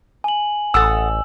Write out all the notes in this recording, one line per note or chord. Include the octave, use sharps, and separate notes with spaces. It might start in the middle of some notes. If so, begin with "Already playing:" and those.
G#5 F#7
A1 A4 F#5 D#6 E6